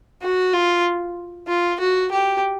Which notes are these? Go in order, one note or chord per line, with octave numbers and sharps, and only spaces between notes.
F#4
F4
F4
F#4
G4